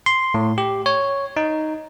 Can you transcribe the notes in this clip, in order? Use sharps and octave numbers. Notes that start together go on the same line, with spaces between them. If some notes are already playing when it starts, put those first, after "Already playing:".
C6
A2
G4
C#5
D#4